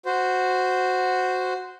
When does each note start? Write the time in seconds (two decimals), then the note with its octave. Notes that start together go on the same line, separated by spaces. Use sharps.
0.06 F#4 C5